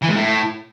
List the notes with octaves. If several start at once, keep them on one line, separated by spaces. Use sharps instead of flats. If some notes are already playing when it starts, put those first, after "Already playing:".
E3
G#2
A2